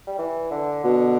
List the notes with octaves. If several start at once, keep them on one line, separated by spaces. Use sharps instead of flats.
G3
E3
D3
B2 D3